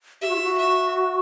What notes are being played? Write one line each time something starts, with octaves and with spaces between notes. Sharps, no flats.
G4 E5
F#4
F4
F#4
E5